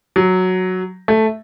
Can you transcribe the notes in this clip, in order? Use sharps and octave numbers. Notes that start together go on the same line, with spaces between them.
F#3
A3